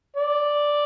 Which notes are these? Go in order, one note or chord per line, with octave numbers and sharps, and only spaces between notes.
D5